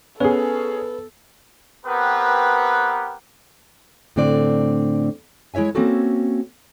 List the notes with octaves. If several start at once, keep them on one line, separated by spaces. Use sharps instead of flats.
B3 C#4 G#4 A4 B4
B3 C4 G4 A#4 B4
A2 D3 A3 C4 D4 D5
G#3 E4 C#5 E5 G#5
A#3 C4 C#4 F#4 A4